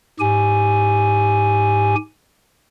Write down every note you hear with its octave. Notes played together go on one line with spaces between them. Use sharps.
G#2 G4 G#5